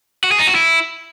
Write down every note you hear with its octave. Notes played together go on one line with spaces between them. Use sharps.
F#4
G#4
D#4
F#4
E4